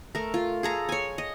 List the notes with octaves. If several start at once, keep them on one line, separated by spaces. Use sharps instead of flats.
A3 A#4
F4
G#4 A4 A#5
C#5 G#5
D#5